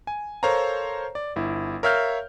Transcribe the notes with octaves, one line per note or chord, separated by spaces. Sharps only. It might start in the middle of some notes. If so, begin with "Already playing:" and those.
G#5
A4 A#4 C5 C#5 F5 A#5
D5
G1 E4
A#4 C#5 E5 F5 F6 G6